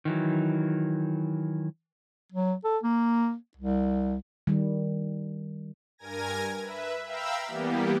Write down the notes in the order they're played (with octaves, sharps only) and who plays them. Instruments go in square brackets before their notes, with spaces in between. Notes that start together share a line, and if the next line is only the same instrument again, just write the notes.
[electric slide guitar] D#3 E3 F#3
[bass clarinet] F#3
A4
A#3
C2
[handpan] D#3 G3
[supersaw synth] G2 A#4 G#5 G#6 A#6
B4 E5
E5 F5 G5 A#5 B5 E6
E3 G3 A#3 B3 G4